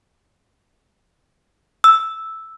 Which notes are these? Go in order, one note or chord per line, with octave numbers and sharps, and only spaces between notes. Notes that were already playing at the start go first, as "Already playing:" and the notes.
E6